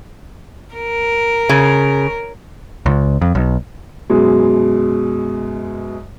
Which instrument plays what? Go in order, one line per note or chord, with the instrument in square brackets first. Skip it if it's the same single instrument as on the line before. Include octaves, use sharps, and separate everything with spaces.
[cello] A#4
[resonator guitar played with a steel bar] C#3
[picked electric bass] C#2
F2
B1
[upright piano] F#2 B2 G#3